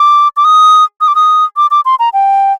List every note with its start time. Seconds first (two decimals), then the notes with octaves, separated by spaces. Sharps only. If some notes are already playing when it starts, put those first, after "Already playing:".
Already playing: D6
0.37 D6
0.45 D#6
1.01 D#6
1.08 D6
1.15 D#6
1.57 D6
1.71 D6
1.85 C6
1.99 A#5
2.13 G5